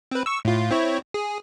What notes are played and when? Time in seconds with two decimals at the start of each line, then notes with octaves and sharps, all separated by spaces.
0.11 C4 B4
0.26 C#6 E6
0.45 A2 F4
0.71 C4 E4 C#5
1.14 G#4